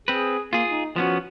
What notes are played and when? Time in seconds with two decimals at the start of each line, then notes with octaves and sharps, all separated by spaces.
0.08 C4 G#4 B4
0.53 A#3 F4 G#4
0.69 D#4
0.96 F3 B3 C#4 F#4